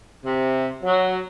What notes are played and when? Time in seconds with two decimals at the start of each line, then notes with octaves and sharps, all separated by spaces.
0.25 C3
0.82 F#3